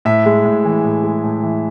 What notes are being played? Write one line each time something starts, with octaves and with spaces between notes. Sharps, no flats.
A2 E5
G#3
A2
E3
A2
G#3
A2
E3